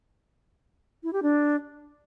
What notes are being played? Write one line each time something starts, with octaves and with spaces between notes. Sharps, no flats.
E4
G4
D4